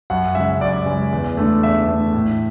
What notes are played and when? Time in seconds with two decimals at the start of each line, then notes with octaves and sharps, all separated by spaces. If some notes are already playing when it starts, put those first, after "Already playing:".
0.10 F#2 F#5
0.35 C#3 G#3 E5
0.61 F#2 D5
0.86 C#3 G#3
1.13 E2
1.37 D3 A3
1.62 E2 E5
1.88 D3 A3
2.14 A2